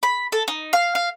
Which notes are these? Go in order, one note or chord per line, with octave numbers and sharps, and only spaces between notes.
B5
A4
D#4
F5
F5